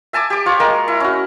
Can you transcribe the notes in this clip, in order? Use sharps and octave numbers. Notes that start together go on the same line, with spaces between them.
E5 G#5 A5 D6
G4 D6
F4 C#5
G#3 A#3 A#4
E4
C#4 F#4